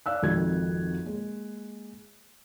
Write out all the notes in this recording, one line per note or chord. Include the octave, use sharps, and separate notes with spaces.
D5 F5 E6 F#6
G#1 F2 D#3 F#4 G#6
G#3 A#3